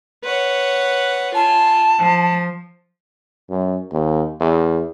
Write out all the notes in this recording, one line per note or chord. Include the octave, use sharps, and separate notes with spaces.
B4 C#5 F#5
F4 G#5 A5
F3
F#2
D#2
E2